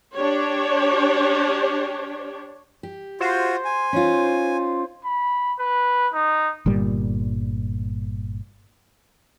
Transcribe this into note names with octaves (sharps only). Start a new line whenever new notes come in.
D4 G4 C#5
G4
F4 F#4 C5
G#5
C#4 D#4 F4
B5
B4
D#4
G1 A#2 G3